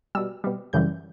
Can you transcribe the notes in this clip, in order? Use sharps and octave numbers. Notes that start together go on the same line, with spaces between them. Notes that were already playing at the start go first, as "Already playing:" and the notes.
B2 G3 E6
B2 G3
F#2 C#3 E3 G3 G6